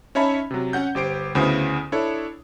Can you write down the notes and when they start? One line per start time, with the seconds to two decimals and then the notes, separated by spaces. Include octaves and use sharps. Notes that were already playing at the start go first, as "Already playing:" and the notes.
0.15 C#4 D#4 C#5 E5 A5 B5
0.51 C3 F#3
0.73 C#4 F#5 G6
0.95 G1 G4 C5 D7
1.35 D2 C#3 B3 E4 C5 D#6
1.92 D4 E4 A4 C#5